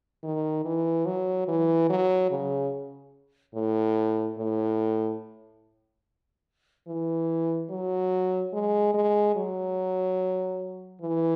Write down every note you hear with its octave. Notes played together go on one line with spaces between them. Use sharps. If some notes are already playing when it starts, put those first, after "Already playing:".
D#3
E3
F#3
E3
F#3
C#3
A2
A2
E3
F#3
G#3
G#3
F#3
E3